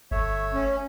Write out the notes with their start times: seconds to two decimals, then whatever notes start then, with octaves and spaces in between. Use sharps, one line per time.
0.11 G1 A3 C#5 E5
0.54 C#4